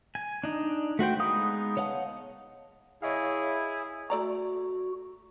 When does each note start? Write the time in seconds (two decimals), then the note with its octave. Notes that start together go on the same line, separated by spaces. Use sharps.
0.15 G#5
0.44 D4 D#4
0.99 A3 F#4 C5 G5
1.19 G#3 B3 D#4 F5 D#6
1.77 C#5 D#5 F5 F#5 A5
3.02 E4 G#4 C#5 D#5 F5
4.10 A3 F#4 D5 A#5